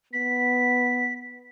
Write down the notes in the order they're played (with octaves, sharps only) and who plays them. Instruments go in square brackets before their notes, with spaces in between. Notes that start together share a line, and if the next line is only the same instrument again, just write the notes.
[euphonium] B3 [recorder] B6